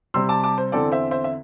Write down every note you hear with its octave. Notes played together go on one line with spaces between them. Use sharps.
C3 G3 C4 C6 E6
A5 D6
A5 D6
C5
E2 D3 C4 A4 D5
C5 E5
C5 E5
E5